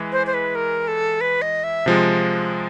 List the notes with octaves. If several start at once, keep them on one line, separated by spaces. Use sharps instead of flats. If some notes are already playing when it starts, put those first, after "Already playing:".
Already playing: E3 G#3
C5
C5
B4
A#4
A4
B4
D#5
E5
C3 F3 G#3